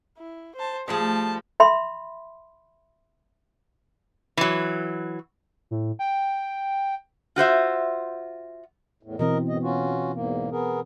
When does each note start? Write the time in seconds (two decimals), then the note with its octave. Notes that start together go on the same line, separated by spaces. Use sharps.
0.18 E4
0.56 C5 A5
0.88 F3 G3 A3 G#4 A5
1.60 E5 B5 C6
4.37 E3 F#3
5.71 A2
5.99 G5
7.36 F4 F#4 C5 E5
9.03 E2 A2
9.19 B2 E3 C4 A#4 D#5
9.49 F#2 A2 D#5
9.63 C#4 F4 F#4
10.15 E2 G#2 A#3
10.52 B3 G#4 A#4